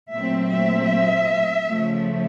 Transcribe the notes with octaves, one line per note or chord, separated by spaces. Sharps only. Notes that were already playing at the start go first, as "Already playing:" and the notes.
A#2 F#3 A3 C4 E5
E5
C#3 F3 A3